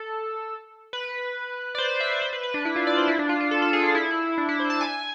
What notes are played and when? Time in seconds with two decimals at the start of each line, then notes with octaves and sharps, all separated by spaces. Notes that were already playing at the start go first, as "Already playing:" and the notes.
Already playing: A4
0.93 B4
1.75 D5
1.78 C5
1.90 D5
2.00 E5
2.12 D5
2.22 C5
2.33 B4
2.43 B4
2.54 D4
2.65 E4
2.76 F4
2.87 D5
2.98 C5
3.08 E4
3.19 D4
3.29 F4
3.40 F4
3.51 A4
3.62 A4
3.73 G#4
3.84 F4
3.95 E4
4.38 D4
4.49 E4
4.60 C5
4.70 A5
4.81 G#5